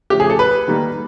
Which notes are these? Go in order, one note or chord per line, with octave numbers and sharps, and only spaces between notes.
C#3 F3 A3 G4
G#4
A4
B4
D#3 G3 A#3